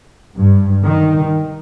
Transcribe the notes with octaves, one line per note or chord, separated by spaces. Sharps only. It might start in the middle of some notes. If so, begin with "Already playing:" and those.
G2
D#3